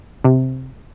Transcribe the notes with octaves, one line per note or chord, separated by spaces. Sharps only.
C3